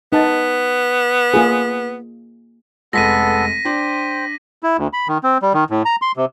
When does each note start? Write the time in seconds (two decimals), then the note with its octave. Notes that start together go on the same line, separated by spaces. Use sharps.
0.12 B3 D#4 F#5 A5
1.34 A#3 F4 G#4
2.93 F1 G#3 B3 A4 A#6 B6 D#7
3.65 D4 C5 G5
4.63 E4
4.78 D2
4.93 B5
5.08 D#3
5.23 C4
5.42 G3
5.54 D#3
5.70 A2
5.85 A#5
6.02 C6
6.17 C3